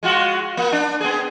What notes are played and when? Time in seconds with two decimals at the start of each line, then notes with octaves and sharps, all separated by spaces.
0.03 G#3 F4 F#4
0.57 A#3
0.72 D4
1.01 B3 G#4